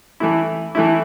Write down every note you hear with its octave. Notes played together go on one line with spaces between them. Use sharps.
E3 A3 E4
E3 A3 E4